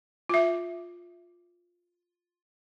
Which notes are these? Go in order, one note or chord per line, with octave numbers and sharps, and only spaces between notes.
F4 E5